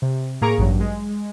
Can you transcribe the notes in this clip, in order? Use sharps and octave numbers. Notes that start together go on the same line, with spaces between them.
C3
A2 A#3 G#4 A#5 C#6 D7
A1 G2 F#3
G#3